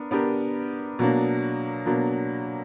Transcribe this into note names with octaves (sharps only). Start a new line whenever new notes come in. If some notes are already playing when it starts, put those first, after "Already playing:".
Already playing: B3 D4 A#4
B3 D4 G4 A#4
B2 F#3 A#3 D4
B2 F#3 A#3 D4